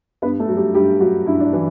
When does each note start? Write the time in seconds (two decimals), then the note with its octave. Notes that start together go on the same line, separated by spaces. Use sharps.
0.22 G2 B3 B4
0.40 A3 A4
0.48 F#3
0.57 G3 G4
0.74 G2 G3 G4
1.01 F#3 F#4
1.26 G2 E4
1.40 D4
1.53 E3 F#3 E4